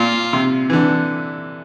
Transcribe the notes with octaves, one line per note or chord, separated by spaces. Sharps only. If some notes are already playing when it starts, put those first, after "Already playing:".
Already playing: A#2 F4
C3
E3
D3